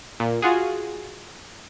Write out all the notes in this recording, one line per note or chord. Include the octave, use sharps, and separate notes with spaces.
A#2
F4 F#4 G#4